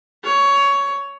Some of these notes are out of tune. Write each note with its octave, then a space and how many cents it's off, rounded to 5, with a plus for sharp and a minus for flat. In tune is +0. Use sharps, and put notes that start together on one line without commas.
C#5 +15